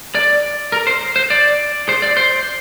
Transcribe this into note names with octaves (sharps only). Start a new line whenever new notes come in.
D5
A#4
C5
C5
D5
C5
D5
C5